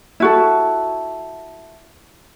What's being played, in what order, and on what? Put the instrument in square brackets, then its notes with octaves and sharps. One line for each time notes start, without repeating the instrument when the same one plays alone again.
[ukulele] E4 F#4 A4